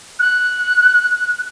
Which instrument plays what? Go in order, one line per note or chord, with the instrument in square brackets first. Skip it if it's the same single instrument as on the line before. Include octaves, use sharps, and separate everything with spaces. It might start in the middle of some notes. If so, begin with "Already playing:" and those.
[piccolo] F#6